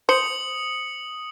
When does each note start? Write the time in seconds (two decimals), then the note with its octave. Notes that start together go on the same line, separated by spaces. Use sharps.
0.09 C5 D#6 C#7 F#7